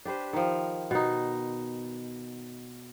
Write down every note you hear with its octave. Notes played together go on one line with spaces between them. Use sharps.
D4 G4 B4 C5
D#3 F3
B2 D#4